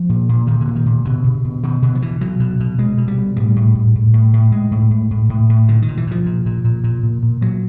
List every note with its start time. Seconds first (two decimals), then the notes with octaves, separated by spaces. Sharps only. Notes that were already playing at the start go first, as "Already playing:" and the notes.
Already playing: F3
0.09 A#2
0.29 A#2
0.47 A#2 D#3
0.61 D3
0.67 A#2
0.75 D#3
0.86 A#2
1.05 B2 D3
1.24 B2
1.45 B2
1.63 B2 D#3
1.82 B2 D3
1.95 F3
2.02 B2 E3
2.21 B2 F#3
2.40 B2
2.60 B2
2.78 B2 G#3
2.98 B2
3.08 G3
3.18 B2
3.36 A2 G3
3.56 A2
3.75 A2
3.95 A2
4.13 A2
4.33 A2
4.52 A2 G#3
4.71 A2
4.91 A2
5.11 A2
5.30 A2
5.49 A2
5.68 A#2 D3
5.82 D#3
5.88 A#2
5.97 E3
6.07 A#2 F3
6.26 A#2
6.46 A#2
6.64 A#2
6.84 A#2
7.03 A#2
7.23 A#2
7.41 A#2 F#3